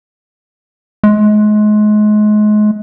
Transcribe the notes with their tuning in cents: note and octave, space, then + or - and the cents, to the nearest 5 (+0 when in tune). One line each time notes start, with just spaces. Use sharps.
G#3 +30